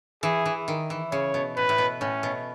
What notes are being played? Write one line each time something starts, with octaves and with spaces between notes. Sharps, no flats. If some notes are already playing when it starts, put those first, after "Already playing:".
E3 G#4
E3
D#3
E3
C#3 C#5
B2
A2 B4
A2
B2
A2 C#4
B2